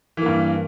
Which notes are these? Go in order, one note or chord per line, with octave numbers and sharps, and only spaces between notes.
G2 E3 A#3